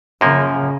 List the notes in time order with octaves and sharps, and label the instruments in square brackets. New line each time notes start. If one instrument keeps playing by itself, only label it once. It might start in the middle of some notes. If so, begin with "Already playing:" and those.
[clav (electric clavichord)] F#2 F3 A#3 [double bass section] C#3